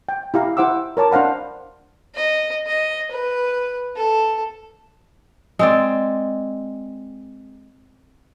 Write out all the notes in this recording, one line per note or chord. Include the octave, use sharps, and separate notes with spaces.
G5
E4 G4 F5 A#5
E4 C5 F#5 D6 E6
A#4 C#5 A5 D6
D4 C5 F5 F#5 B5
D#5
D#5
B4
A4
G#3 C4 D5